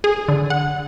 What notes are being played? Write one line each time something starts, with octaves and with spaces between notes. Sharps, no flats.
G#4
D3
F#5